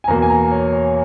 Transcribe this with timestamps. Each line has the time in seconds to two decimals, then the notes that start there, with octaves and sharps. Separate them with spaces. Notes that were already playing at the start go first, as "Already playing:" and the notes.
0.04 G#5
0.08 E2 B2 A#3 A#5
0.22 G#5
0.30 A#5
0.51 C#5
0.73 C#5